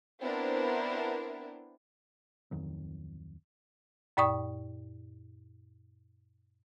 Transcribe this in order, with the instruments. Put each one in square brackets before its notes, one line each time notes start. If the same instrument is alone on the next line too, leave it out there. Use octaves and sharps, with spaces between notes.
[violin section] B3 C4 D4 E4 A#4 C5
[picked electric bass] D1 F2 D#3 F#3
[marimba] F#2 A#2 D5 G5 C#6 D#6